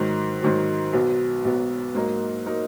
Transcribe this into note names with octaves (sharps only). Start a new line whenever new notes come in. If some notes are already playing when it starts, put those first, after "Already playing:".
Already playing: G#2 D#3 F#3
G#2 D#3 F#3
B1 B2 F#3 B3
B1 B2 F#3 B3
G#2 F#3 A#3 D#4 A#4
F#3 A#3 D#4 A#4